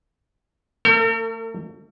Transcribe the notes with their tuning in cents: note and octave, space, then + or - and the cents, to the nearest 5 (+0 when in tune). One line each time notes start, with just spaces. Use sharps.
A3 +35 A#4 -45